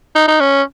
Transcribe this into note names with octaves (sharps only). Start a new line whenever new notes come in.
D#4
D#4
C#4